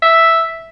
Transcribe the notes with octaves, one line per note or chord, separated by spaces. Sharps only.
E5